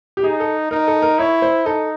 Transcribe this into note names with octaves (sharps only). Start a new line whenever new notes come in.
G4
D#4 G#4
A4
D#4 A#4
A4
A#4
E4 C#5
C5
D#4 A4